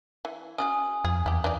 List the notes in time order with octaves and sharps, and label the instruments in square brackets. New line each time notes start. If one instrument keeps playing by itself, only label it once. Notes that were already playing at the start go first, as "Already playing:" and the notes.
[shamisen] E3
[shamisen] C#4 F#4 G#4 [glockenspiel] G#5 D#6
[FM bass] F2 [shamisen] G#4
[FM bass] E2 [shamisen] E4 G4
[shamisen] E3 D#4 D5